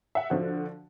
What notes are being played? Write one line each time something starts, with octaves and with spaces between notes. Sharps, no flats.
E5 F#5
D3 F3 F#4